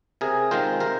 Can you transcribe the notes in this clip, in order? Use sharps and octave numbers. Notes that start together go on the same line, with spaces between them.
C3 G#4 A#4
D#3 G#3 C4 F4 A#4 C5
C3 A#4 C5